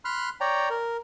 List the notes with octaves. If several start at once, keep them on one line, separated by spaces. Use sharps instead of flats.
B5 C6 F6 F#6
C#5 D5 G5 A#5
A#4